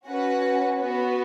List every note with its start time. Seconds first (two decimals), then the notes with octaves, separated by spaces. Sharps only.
0.09 C#4 F#4 B4 F#5
0.79 B3 F#4 B4